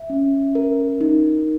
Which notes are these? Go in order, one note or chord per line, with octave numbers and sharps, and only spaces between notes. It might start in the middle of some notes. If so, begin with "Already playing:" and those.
Already playing: E5
C#4
A#4
D#4